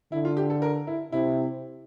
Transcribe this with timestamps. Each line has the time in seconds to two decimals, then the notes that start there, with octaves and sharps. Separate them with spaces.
0.12 D3 E4
0.25 F4
0.37 G4
0.50 A4
0.62 A#4
0.87 E4
1.12 C3 E4